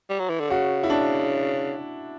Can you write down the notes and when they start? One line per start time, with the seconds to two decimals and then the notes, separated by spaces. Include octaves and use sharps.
0.09 G3
0.19 F#3
0.29 E3
0.40 D3
0.50 C#3 F#4
0.83 E4
0.90 D4